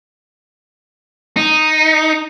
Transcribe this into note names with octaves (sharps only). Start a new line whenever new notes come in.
D#4